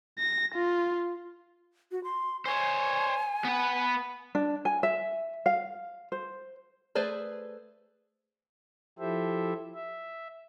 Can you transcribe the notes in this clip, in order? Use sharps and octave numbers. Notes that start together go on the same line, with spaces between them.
A#6
F4
F#4
C6
C5 C#5 G#5
B3 B4
D4
G#5
E5
F5
C5
A3 G#4 B4 C5 D5
F3 E4 G4 A4 C5 E5
E5